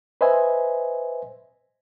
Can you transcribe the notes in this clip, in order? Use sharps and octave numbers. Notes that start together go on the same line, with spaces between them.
B4 C5 D#5 E5 G#5